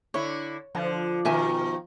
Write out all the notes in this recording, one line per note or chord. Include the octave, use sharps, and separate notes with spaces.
D3 E4 C#5
D3 F3
B2 D#3 A#4 E5 G#5